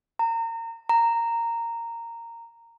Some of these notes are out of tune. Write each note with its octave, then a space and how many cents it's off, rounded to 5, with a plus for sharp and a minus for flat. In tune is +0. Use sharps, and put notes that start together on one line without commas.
A#5 -30
A#5 -10